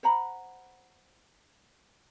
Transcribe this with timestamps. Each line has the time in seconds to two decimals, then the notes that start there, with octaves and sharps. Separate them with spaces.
0.03 C5 F#5 A#5 B5